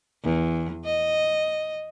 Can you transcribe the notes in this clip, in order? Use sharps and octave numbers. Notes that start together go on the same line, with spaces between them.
E2
D#5